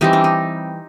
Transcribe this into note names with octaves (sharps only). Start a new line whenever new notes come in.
E3 G3 C4 D#4
D4
D#4